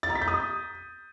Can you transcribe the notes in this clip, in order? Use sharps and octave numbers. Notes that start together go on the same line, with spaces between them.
A6
A#5
B6
G6
D#6